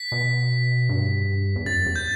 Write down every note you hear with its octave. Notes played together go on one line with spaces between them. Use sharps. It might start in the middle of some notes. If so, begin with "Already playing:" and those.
Already playing: B6
B2
G2
E2
F#2 A6
E2
G6